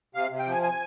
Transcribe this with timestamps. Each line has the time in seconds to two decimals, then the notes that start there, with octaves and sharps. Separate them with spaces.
0.15 C3 F5
0.31 C3
0.39 G5
0.47 F3 G#5
0.63 G#5